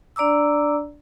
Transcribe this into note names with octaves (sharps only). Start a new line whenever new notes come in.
D4 D5 A#5 D6 E6